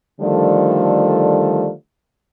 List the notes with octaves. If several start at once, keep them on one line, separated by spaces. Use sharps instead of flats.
D3 D#3 F3 G3 A3